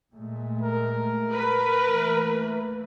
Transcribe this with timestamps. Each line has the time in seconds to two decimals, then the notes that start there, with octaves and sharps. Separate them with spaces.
0.12 A#2 G#3 A3
0.62 A#4
1.33 B4
1.88 E3 A3 A#3